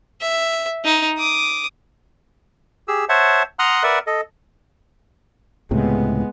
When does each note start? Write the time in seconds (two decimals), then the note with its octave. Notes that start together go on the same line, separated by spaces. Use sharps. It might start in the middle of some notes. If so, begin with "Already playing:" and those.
0.21 E5
0.84 D#4
1.18 D6 D#6
2.88 G4 G#4 E6
3.09 C5 C#5 E5 F#5 A5
3.59 F#5 A#5 C6 D#6 F6 F#6
3.83 A#4 B4 D5 E5 F#5
4.07 A4 D#5
5.71 C#2 A2 C3 G#3 B3